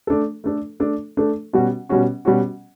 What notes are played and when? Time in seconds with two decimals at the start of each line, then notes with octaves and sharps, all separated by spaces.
0.07 A3 D4 A4
0.44 A3 D4 A4
0.80 A3 D4 A4
1.17 A3 D4 A4
1.53 B2 G3 C#4 F#4
1.89 B2 G3 C#4 F#4
2.25 B2 G3 C#4 F#4